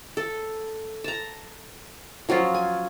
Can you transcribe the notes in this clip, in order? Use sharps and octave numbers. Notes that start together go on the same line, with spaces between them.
A4
A5 A#5
F3 F#3 C#4 F4
G#5